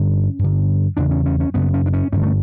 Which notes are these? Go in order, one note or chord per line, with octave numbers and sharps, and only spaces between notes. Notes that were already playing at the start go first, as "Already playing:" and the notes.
Already playing: G2 D3 C#4
G2 D3
E2 C#3 D4
C#4
C#4
C#4
F#2 C#3 B3
C#4
D4
C#4
G2 D3 C#4
A3